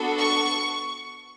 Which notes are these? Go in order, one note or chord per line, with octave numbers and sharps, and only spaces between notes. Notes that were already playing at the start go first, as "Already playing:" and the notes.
Already playing: B3 D4 F#4 A4
C#6